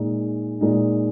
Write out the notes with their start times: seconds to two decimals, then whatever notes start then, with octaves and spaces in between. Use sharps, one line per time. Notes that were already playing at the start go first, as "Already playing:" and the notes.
Already playing: A#2 G#3 D#4
0.61 A#2 G#3 D#4